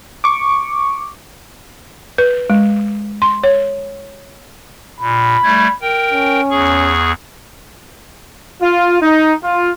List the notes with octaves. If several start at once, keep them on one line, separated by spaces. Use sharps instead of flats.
C#6 D6
B4
G#3
C6
C#5
A#2 B5
G3 A3 G#6
A#4 G5
C#4
E2 G#4 C#6
F4
D#4
F4